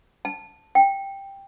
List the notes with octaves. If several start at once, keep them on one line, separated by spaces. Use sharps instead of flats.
A5
G5